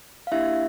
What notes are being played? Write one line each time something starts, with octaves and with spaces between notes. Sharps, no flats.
F5
A#3 D4 E4 G4 E5